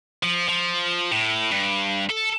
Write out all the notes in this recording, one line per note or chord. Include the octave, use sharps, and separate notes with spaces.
F3
F3
A2
G2
A4